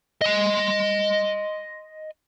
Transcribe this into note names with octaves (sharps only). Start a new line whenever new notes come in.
D#5 C6